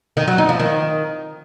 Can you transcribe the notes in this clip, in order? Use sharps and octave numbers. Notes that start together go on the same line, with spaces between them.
D#3
F#3
D#4
F3
D#3